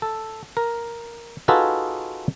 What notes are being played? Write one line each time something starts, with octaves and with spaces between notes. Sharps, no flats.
A4
A#4
D#4 F4 F#4 G#4 A4 B4